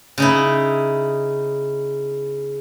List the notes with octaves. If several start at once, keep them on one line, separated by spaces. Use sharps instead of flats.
C#3 D#4 E4